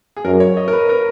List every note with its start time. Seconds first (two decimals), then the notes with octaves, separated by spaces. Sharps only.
0.17 G#4
0.24 F#2 A#4
0.40 C#5
0.57 D#5
0.68 A#4
0.73 B4
0.89 A#4